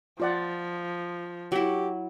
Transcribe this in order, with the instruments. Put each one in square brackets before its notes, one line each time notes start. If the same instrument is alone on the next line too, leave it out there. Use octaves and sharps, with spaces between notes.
[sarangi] F3 [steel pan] F4 D5 F#5
[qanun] F#3 E4 [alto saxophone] G4